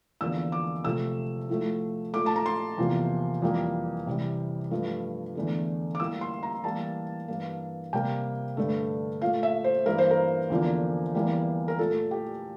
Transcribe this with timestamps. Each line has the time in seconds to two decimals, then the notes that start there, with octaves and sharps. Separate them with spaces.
0.21 E2 D3 F3 A#3 E6
0.52 D6
0.84 C3 F3 A3 E6
1.49 A2 F3 A3
2.13 A#2 A3 D6
2.26 A5
2.36 A#5
2.46 C6
2.78 E2 C3 F3 A#3
3.42 F2 E3 G3 A#3
4.07 C3 E3 G3
4.71 G2 F3 A3
5.35 E2 D3 A3
5.95 D6
6.00 A2 G3 A#3 E6
6.21 C6
6.43 A#5
6.64 A2 E3 G3 A#3 A5
7.28 G2 E3 A#3
7.93 C3 G3 A#3 G5
8.57 G2 D3 A3
9.22 A#2 A3 F5
9.43 E5
9.64 C5
9.86 G2 E3 A#3 A#4
9.98 C5
10.11 A#4
10.50 E2 D3 F3 A#3
11.15 E2 E3 G3 A#3
11.68 A#4
11.79 A#2 A3 A4
12.11 G4